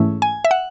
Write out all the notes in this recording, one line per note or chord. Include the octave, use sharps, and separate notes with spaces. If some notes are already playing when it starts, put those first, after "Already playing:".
Already playing: G#2 E3 A3 C#4 E4
G#5
E5
F#5